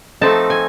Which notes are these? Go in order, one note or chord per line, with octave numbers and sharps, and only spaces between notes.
F3 A3 C4 D#4 A5
G#5